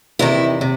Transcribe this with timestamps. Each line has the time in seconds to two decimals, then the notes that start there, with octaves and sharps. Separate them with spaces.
0.19 E2 C3 D#3 E4
0.61 C3